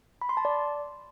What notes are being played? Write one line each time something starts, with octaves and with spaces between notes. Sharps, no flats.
B5
C6
A5
D5